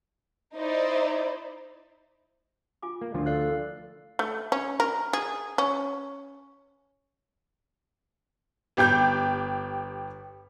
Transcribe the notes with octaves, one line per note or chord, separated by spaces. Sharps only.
D#4 E4 C5 D5
F4 G#5 D6
A#3
D2 F3 D4 F4 A#4
A4 D5 F5 F#6
A3
C#4
A#4
G#4
C#4
G1 G4 G5 G6